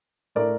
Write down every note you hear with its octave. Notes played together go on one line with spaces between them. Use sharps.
A2 A3 A#4 D5